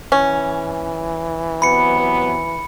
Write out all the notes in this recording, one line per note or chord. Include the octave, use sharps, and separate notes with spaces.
E3 C#4
C3 F#3 B3 B5 C#7